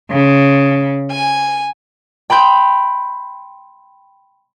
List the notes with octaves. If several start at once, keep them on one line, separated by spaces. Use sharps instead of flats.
C#3
G#5
G5 B5 C6 G6